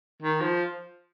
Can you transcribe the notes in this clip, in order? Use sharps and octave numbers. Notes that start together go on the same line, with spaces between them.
D#3
F3